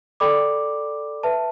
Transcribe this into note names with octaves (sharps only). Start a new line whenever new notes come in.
A4 D5 G5 B5 D6
B4 E5 A5